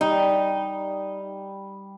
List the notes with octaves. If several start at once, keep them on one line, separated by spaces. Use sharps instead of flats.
G3 D#4